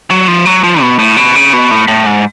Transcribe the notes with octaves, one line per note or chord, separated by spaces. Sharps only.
F#3
F3
F#3
F3
B2
A2
B2
C#3
B2
A2
A2
G#2